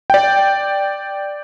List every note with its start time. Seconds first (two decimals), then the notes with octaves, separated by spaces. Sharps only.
0.10 D5 G5